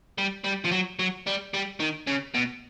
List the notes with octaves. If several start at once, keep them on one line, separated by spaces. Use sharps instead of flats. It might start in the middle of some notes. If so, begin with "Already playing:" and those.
G3
G3
F3
F#3
F#3
G3
G3
D#3
C#3
B2